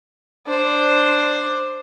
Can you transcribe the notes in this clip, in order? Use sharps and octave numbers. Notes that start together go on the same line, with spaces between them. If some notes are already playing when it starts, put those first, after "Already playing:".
D4 C5